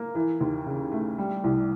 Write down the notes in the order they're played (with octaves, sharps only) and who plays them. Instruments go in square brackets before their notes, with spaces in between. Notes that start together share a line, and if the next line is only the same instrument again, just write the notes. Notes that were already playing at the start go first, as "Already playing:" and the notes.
Already playing: [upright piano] A#3
E3
D#2
C#3
A3
G3
C2